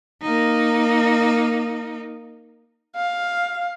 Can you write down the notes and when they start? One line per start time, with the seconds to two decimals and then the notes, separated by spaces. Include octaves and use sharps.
0.22 A#3 D#4
2.96 F5